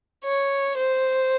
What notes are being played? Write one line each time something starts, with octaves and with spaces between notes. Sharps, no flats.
C#5
C5